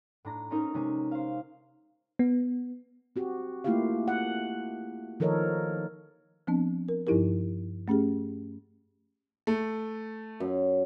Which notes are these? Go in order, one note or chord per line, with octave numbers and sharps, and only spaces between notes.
A2 D4 A#5 A#6
C4 C#4 D#4 A#4
C3 G#3 C#4
C5 F5
B3
C4 F#4 G4
A3 A#3 E4 F4 G4 F5
F#5
D#3 F3 A4 A#4 C#5 D#5
F3 B3 C4 D4
A#4
G2 F3 D#4 E4 G4 A#4
A3 C#4 G4 G#4
A3
F#2